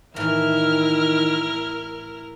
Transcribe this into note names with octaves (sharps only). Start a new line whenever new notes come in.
A2 D#3 E3 E4 A#4 F6